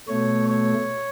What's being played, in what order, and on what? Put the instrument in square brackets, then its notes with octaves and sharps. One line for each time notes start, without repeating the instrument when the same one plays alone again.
[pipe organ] B2 A3 C#5
C#5